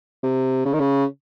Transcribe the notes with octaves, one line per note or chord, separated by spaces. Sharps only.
C3
C#3
D#3
C#3